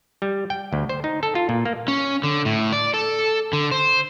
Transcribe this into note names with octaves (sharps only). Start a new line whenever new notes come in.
G3
G5
D2
C5
D#4
A4
F4
A#2
A#3
C#4
D3
A2
D5
A4
D3
C5